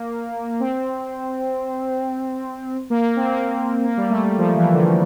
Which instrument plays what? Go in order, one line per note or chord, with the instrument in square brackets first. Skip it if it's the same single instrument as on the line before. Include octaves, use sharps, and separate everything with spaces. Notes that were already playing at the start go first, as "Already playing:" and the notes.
Already playing: [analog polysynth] A#3
C4
A#3
A#3
C4
A#3
A#3
G3
A3
G3
F3
E3
D3